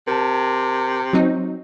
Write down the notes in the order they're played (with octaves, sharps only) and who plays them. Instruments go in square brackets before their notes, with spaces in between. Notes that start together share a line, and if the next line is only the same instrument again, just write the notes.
[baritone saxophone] C3 [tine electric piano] A#4 A5
[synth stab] F#3 C4 D#4